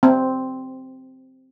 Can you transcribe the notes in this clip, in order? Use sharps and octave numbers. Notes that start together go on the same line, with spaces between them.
C4